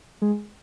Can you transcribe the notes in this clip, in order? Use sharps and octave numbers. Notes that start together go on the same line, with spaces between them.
G#3